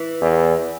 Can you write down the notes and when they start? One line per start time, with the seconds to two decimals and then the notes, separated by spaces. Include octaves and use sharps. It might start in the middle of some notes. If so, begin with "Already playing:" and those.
Already playing: E3
0.21 E2